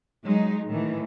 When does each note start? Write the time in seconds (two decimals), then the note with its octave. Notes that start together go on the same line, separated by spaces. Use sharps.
0.24 F#3 G#3 D#4
0.68 A2 D#3 E3